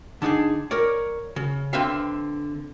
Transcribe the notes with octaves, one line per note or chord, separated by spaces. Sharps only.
D3 D4 D#4 F#4 G#4
A#4 C#5 D5
C#3
D3 C4 B4 E5 F5